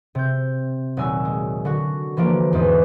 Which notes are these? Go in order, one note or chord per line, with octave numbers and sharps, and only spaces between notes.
C3 G6
D#1 F#3 G#5 E6
G#3
D3 F#4
E3 F3 A#3 D4
E2 G#2 G#3 B4